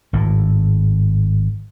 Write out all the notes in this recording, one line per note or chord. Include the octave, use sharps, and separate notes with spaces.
G#1 A2